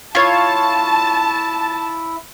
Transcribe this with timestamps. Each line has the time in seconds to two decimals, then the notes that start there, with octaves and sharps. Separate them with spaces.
0.15 E4 F4 C#5 A5